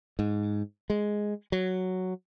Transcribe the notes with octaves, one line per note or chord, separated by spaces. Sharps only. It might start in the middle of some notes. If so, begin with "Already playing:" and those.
G#2
G#3
F#3